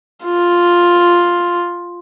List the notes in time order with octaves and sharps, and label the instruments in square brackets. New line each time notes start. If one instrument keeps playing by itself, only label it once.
[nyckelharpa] F4